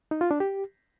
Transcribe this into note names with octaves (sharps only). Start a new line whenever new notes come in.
D#4
F4
D4
G4